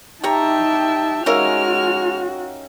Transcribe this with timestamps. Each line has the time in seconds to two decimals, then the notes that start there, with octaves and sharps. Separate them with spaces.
0.24 D#4 G4 C#5 E5 G5 A5 A#5
1.26 G#3 C#4 D#4 F#4 A#4 E5 F5 F6